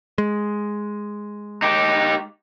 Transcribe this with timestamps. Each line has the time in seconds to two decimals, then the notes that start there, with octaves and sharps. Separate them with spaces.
0.18 G#3
1.62 D#4 G4